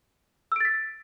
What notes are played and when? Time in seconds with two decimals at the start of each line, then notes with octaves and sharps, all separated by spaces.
0.52 E6
0.56 D7
0.60 A6
0.65 B6